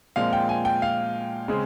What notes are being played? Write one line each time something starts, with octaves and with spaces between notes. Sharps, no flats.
A#2 F3 G#3 C4 F5
G5
G#5
G5
F5
C#3 G#3 C4